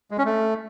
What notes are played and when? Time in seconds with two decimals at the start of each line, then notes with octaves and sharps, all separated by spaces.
0.11 G#3
0.18 C#4
0.26 A3